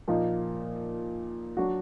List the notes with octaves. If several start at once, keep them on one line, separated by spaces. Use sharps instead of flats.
A#2 F3 A#3 D#4
F#3 D4 F#4